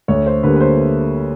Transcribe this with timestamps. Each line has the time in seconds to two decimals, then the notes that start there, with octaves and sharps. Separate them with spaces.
0.08 D2 C#5
0.26 C5
0.43 D3 G3 A#3 B4
0.56 B4
0.60 C5